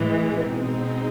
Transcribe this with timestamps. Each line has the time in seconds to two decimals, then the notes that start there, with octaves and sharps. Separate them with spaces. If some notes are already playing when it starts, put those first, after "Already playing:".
Already playing: A2 E3 G#3
0.37 B2 G#3 C4 D#4